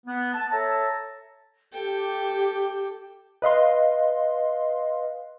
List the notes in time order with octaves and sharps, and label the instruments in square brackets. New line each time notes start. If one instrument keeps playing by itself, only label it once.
[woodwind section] B3
A5
A4 C#5 E5 A5 A#5
[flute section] G4 [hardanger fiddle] A4 G5
[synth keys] B4 D#5 F5 C6